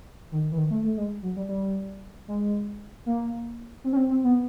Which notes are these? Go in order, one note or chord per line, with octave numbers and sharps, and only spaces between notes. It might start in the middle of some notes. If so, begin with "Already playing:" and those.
D#3
E3
D#3
A3
A3
G#3
F#3
G3
G3
G#3
A#3
C4
C#4
C4
C4
B3